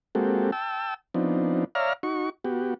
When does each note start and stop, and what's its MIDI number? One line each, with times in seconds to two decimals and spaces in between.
0.15 0.51 56
0.15 0.51 58
0.15 0.51 60
0.15 0.51 66
0.15 0.51 67
0.15 0.51 69
0.52 0.94 79
0.52 0.94 81
0.52 0.94 88
1.14 1.64 53
1.14 1.64 59
1.14 1.64 60
1.14 1.64 62
1.14 1.64 63
1.75 1.93 73
1.75 1.93 74
1.75 1.93 76
1.75 1.93 77
1.75 1.93 82
1.75 1.93 89
2.03 2.30 63
2.03 2.30 66
2.03 2.30 85
2.45 2.74 59
2.45 2.74 66
2.45 2.74 67